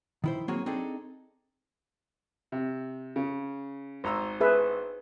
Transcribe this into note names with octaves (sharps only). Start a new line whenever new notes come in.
D#3 E4 C5
F#3 A#3 C4 F#4 G#4 C#5
C4 D4 D#4 G#4 A4
C3
C#3
G#1 A#5 E6
G#4 B4 E5